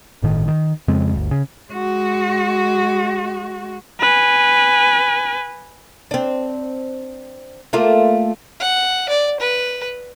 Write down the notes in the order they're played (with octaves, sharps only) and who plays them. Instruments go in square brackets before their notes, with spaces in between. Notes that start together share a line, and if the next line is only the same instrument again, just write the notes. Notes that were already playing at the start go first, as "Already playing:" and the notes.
[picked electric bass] G1 A2 D#3
D#3
F2 C#3 G#3 C4
G1 D2
C#3
[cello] G#3 F#4
[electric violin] B4 G#5
[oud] C4 D4
A3 A#3 F4
[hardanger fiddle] F#5
D5
B4